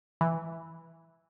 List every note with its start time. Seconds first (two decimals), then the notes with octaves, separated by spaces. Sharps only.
0.21 E3